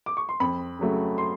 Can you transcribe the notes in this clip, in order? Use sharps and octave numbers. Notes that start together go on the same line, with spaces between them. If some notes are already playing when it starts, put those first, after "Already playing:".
D6
C#6
C6
F2 B5
C#3 F#3 A3
C6